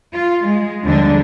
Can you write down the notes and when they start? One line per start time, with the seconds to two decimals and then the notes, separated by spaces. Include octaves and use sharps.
0.13 F4
0.45 G#3
0.84 D#2 D3 F3 G3 G#3 D4